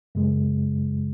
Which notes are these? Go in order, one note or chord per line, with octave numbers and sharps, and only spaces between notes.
F#2 C#3 G#3